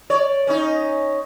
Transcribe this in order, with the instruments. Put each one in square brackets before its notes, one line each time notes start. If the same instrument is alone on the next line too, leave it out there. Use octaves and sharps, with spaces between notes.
[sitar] C#5 D5
C#4 D#4